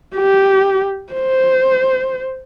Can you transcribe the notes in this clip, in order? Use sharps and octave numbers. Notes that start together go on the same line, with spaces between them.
G4
C5